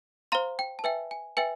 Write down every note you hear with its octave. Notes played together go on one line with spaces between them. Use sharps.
C5 F5 A#5 C6
G5
A5
B4 E5 G5 G#5
G#5
B4 E5 G5 G#5